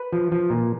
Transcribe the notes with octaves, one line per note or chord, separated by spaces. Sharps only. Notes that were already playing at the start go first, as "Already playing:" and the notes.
Already playing: B4
F3
F3
A#2